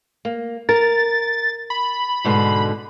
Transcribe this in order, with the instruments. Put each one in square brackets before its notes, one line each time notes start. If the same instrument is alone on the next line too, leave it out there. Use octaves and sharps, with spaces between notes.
[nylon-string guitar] A#3
[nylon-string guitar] A#4 [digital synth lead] A6
[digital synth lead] B5
[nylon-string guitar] G#2 B2 D3